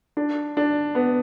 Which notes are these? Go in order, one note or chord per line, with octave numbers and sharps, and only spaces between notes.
D4
D4
B3